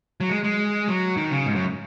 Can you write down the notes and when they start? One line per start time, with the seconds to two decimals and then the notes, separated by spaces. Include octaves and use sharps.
0.21 F#3
0.29 G#3
0.44 G#3
0.88 F#3
1.17 D#3
1.31 C#3
1.46 G#2
1.55 F#2